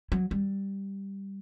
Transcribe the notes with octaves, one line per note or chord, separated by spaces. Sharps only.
F#3
G3